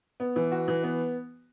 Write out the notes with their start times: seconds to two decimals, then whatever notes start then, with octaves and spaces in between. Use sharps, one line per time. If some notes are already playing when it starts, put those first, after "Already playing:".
0.20 B3
0.36 E3
0.52 F#4
0.68 E3
0.83 B3